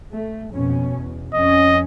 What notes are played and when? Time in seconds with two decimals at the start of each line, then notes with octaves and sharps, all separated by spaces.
0.11 A3
0.51 F2 B2 C#4
0.96 E2
1.34 F2 C#4 D#5